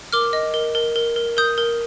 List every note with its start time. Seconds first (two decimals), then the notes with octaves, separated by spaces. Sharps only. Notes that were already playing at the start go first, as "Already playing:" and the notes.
0.13 A#4 D6 F6
0.33 D#5
0.54 A#4
0.75 A#4
0.96 A#4
1.16 A#4
1.37 A#4 D#6 G6
1.58 A#4